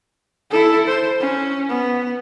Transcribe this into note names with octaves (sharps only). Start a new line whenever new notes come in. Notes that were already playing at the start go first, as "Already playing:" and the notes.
E4 A4
C5
C#4
B3